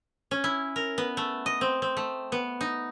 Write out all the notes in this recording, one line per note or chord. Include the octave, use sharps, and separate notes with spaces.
C#4
E4
A#4
B3
A3
D#5
C4
C4
A3
B3
D#4